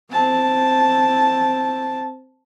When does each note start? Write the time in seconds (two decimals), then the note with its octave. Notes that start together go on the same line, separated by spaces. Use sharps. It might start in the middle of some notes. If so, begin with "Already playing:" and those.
0.10 C4 A5